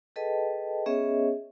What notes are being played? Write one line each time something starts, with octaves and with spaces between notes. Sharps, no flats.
G#4 A4 B4 D#5 G5 A5
B3 C#4 G#4 C#5 D#5 E5